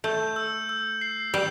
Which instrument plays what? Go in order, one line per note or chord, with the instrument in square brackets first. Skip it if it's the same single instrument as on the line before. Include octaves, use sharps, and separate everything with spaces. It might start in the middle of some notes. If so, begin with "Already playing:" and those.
[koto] A3 [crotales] G6
[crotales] E6
E6
C7
[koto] G3 [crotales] G6